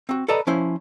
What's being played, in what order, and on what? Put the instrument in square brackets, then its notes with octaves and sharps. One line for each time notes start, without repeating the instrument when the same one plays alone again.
[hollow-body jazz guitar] C4 F#4
A4 B4 D5 D#5 A5 A#5
F3 C#4 E4 C5